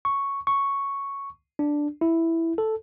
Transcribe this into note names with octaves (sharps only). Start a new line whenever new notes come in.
C#6
C#6
D4
E4
A4